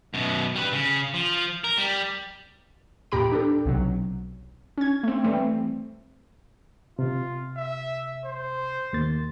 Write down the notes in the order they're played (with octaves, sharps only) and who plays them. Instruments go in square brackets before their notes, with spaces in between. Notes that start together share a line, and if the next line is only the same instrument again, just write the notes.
[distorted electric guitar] F#2 B2
G3 B4
C#3
F3
A#4
G3
[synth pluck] E2 A#2 G4 A#5 B5 D7
D4 G4 A4
B1 C3 F#3
C#4 G#6
A3 C4
E3 G3 A3 C4
[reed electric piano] C3 [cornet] F4
[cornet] E5
C5
[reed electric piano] D#2 A#3 A6